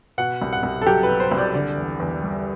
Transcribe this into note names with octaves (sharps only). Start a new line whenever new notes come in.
B2 F#5
C2
F#5
C2
A4
F#3 G4
B4
B2
C5
C2
D5
D3 D5
E2
E2
G3